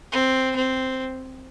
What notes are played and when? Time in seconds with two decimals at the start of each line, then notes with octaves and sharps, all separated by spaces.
0.12 C4
0.56 C4